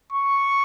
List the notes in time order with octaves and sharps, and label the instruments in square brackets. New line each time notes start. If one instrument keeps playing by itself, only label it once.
[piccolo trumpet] C#6